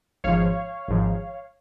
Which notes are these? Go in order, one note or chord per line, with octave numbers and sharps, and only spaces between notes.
G#1 G#2 F3 C#5 F5
G#1 G#2 F3